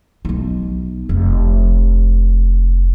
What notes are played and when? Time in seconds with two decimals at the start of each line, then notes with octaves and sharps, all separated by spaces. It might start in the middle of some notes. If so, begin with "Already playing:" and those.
0.25 B1 D#4
1.09 F1